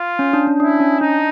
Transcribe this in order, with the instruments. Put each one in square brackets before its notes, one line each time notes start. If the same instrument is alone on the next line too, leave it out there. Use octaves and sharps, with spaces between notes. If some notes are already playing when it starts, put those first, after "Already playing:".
Already playing: [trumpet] F4
[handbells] C#4
D4
C#4
[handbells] D4 [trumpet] E4
[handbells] C#4
[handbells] D4 [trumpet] D#4